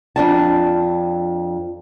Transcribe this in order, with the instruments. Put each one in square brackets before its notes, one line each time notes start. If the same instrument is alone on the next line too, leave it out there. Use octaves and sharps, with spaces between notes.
[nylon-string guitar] F2 D4 A5